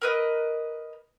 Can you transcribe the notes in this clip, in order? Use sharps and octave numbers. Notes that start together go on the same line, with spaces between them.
A#4 B4 D#5